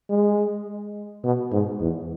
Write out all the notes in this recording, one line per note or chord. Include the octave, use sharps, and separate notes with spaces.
G#3
B2
G#2
E2